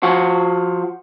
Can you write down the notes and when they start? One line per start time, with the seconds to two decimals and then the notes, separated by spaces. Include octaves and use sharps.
0.03 F3 F#4